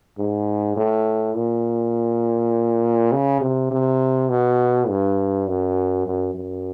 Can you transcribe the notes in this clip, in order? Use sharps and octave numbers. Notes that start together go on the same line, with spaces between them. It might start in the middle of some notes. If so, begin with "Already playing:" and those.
G#2
A2
A#2
C#3
C3
C3
B2
G2
F#2
F#2
F#2